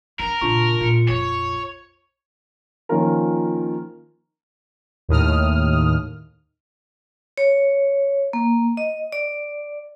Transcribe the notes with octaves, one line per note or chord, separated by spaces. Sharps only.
D4 F4 A#4
A#2 C#3 D4 F4 C#6
A#2 F4 C#7
A#1 F2 C#5
D#3 F3 A#3 C#4 F4 A#4
D#2 A2 D#6 F6
C#5
A#3
D#5
D5